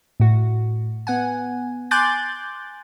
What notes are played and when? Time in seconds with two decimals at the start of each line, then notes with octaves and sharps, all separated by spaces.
0.20 A2 F#4
1.07 B3 F#5 G#5
1.91 G#5 C6 D6 F#6 G6 A6